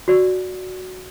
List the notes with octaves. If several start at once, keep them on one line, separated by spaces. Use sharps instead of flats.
F#4 D5